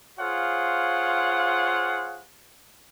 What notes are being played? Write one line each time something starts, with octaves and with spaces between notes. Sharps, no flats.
F4 G#4 C5 C#5 F5 F#5